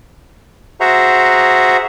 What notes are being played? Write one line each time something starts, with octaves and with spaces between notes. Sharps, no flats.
F#4 G#4 C5 E5 F#5 A#5